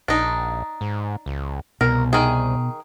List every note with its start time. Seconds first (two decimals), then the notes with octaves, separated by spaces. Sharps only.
0.08 A#1 D4 D#4
0.81 G#2
1.26 C#2
1.81 C2 B2 A#4
2.13 D#3 G#4